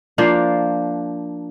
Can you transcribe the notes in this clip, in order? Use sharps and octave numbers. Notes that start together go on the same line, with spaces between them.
F3 A#3 D4 F5